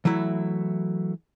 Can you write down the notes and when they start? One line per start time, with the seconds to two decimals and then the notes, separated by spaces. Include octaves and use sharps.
0.05 E3 F#3 A3 E4